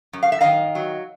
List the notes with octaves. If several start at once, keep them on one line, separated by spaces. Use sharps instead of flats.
F#2
F5
E5
D#3 D#5 F5
F#3